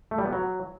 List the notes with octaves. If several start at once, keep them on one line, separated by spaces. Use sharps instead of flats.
A3
G3
B3
F#3